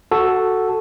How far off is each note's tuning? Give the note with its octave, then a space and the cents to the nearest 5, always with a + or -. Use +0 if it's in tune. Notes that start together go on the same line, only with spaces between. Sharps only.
F#4 +0 A4 +0